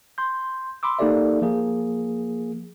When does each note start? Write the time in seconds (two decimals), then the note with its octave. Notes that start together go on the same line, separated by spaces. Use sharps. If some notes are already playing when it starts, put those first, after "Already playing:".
0.18 C6 G6
0.83 B5 C6 D6 E6
0.99 A#3 D#4 G4 A4 D5 E5
1.42 F3 A#3 G#4